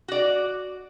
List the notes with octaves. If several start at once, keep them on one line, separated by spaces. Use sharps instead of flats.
F#4 D5